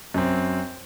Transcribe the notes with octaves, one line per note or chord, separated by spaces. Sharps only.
F#2 C4